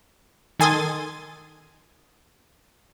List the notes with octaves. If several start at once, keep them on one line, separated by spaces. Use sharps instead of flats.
D#3 A4 G#5 C6 D#6 A6